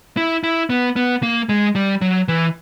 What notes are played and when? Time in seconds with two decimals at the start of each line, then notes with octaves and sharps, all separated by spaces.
0.17 E4
0.44 E4
0.70 B3
0.96 B3
1.23 A#3
1.49 G#3
1.75 G3
2.01 F#3
2.28 E3